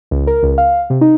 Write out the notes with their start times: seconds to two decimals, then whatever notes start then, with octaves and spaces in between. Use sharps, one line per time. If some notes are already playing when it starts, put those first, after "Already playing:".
0.11 C#2
0.27 A#4
0.43 C#2
0.58 F5
0.90 C3
1.01 D#4